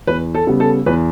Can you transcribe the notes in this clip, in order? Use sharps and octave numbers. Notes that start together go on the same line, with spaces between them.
E2 B4
A4
C#3 G3 B3
A4
E2 B4